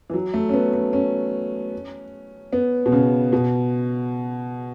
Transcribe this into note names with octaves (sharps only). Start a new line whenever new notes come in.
E3
F#3
A3
C#4
B3
A3
C#4
B3
B2
C#3
B2